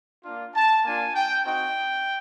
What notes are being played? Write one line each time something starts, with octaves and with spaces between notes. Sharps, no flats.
A#3 D4 F4
A5
A#3 D4 F4 G#5
G5
C4 D#4 F#4 G5